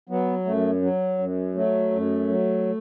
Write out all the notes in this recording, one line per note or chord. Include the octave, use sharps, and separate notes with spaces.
F#3 B3
F#2 A3
F#3
F#2
F#3 A3
F#2
F#3